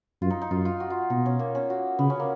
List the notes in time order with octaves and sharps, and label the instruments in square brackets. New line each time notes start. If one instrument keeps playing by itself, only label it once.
[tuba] F#2 [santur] F4
[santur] D#4
D#4
[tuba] F#2 [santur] F4
[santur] F4
F#4
F4
[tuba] B2 [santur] D#4
[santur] C#4
A#3
C#4
F#4
[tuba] C#3 [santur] B3
[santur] C#4
A#3